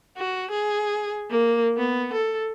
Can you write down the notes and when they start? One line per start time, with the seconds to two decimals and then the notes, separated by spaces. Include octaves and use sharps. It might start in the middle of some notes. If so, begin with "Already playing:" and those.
0.17 F#4
0.51 G#4
1.30 A#3
1.77 B3
2.13 A4